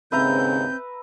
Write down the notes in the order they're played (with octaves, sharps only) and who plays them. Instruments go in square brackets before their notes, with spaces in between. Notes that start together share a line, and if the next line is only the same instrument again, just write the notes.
[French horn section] D#2 G#2 C#3 [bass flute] C4 [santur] B4 E5 A#5 [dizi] G6